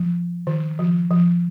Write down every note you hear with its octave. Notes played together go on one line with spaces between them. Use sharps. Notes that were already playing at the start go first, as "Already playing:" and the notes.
Already playing: F3
D#3
F3
F3